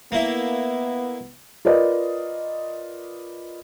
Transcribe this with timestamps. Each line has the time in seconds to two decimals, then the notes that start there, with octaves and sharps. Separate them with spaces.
0.12 A#3 B3 E4
1.65 F4 A#4 B4 D5 D#5